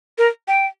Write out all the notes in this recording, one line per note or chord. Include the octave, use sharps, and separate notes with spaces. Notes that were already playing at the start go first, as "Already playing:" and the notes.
A#4
G5